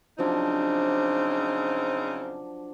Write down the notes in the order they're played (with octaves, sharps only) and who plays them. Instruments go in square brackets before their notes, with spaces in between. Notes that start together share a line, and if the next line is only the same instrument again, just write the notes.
[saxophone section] C#3 C4 D#4 [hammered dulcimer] F3 F#3 D4